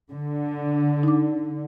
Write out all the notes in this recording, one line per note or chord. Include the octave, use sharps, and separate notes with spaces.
D3
D#4 D6